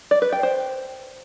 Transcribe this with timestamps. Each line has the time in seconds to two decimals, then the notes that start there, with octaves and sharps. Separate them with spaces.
0.11 D5
0.22 B4
0.33 G5
0.43 C5